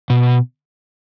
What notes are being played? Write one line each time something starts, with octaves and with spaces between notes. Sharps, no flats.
B2